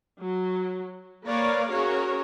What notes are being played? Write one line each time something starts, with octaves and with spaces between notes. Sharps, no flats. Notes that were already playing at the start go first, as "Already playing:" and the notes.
F#3
A#3 A#4 B4 C#5 D5 F5
C#4 F#4 G#4 A#4 C#5